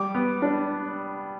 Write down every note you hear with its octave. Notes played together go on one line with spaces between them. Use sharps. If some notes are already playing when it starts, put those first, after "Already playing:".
Already playing: G3 D6
B3
D4